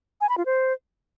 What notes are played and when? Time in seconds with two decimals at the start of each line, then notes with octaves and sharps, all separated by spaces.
0.21 G#5
0.29 B5
0.37 F4
0.46 C5